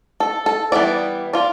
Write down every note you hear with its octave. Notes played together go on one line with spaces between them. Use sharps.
A4
A4
E3 G3 B3 D5
F4 D5